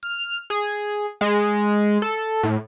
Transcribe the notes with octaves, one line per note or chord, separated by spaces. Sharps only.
F6
G#4
G#3
A4
A2